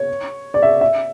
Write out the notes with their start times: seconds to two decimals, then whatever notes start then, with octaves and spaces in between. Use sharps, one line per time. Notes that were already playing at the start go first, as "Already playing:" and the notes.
Already playing: C#5
0.54 D5
0.63 E5
0.81 E5